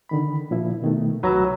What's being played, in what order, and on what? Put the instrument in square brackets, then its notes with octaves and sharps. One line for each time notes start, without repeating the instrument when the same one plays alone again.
[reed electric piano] D3 D#3 B5
A#2 F3 E4
B2 D#3 A3
[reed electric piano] C2 A#5 E6 [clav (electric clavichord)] F#3 B4